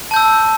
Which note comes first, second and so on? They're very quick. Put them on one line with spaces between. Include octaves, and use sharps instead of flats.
A5 G6 E6